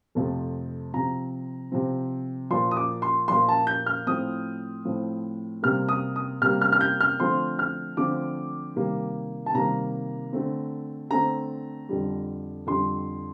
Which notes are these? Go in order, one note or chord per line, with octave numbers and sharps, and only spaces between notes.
F2 C3 F3 A3
C3 F3 C4 A#5
C3 F3 C4
A#2 F3 A#3 C6
D#6
D6
C6
A#2 F3 A#3 C6
A5
G6
F6
A2 F3 C4 D#6
A2 F3 C4
C3 G3 A#3 F6
D#6
D#6
C3 G3 A#3 F6
F6
F6
G6
F6
D3 F3 A3 C4 C6
F6
D3 F3 A3 C4 D6
C3 D#3 G3 A#3
A5
C3 D#3 G3 A#3 A#5
D3 A3 C4
D3 A3 C4 A#5
F2 D3 G3
F2 D3 G3 C6